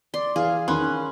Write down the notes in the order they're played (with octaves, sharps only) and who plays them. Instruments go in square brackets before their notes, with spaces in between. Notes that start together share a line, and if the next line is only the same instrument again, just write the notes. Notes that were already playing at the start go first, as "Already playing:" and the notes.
[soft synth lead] D5 [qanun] C6
[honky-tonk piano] E3 [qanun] G#4 [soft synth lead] F5
[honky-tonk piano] D#3 B5 C6 [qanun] C#4 [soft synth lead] F#6